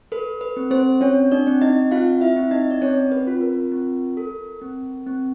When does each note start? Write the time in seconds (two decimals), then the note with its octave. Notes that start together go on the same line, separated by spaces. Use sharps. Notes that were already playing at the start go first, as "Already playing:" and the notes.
0.12 A4 B4
0.41 B4
0.57 C4
0.71 C4 C5
1.01 C4 C#4 C#5
1.32 D4 D5
1.47 C4
1.61 D#4 D#5
1.91 C4 F4 F5
2.21 E4 E5
2.36 C4
2.51 D#4 D#5
2.71 D5
2.81 C4 C#4 C#5
3.12 B4
3.27 F4
3.41 A#4
3.72 C4
4.17 A4
4.62 C4
5.07 C4